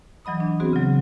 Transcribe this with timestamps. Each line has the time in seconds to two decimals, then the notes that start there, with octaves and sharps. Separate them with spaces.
0.25 E3 F#3 D#5 B5 D#6
0.40 D4
0.60 B3 C4 F#4 G#4 C5
0.73 C#3 F#3